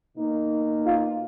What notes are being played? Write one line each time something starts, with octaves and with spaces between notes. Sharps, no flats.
B2 A#3 D#4
F4